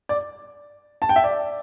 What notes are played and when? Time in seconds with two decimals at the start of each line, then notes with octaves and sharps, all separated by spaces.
0.09 D5
1.02 A5
1.09 G5
1.16 E5
1.24 D5